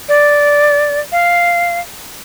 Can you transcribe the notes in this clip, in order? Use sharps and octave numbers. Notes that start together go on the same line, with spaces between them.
D5
F5